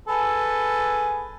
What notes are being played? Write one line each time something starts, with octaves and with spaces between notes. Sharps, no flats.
G#4 A4 B4